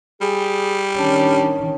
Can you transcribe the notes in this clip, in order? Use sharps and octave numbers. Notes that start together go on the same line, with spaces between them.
G3 G#4
D#3 C#4 D4